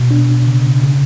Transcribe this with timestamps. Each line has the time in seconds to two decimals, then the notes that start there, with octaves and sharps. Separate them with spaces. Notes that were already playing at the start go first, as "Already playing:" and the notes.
Already playing: B2
0.11 D4
0.47 C#3
0.83 C#3